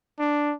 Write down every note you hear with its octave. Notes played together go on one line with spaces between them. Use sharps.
D4